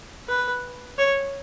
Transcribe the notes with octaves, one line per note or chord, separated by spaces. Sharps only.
B4
C#5